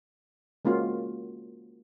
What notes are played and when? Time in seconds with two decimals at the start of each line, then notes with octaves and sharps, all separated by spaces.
0.65 G#3 A#3 C#4 F4 F#4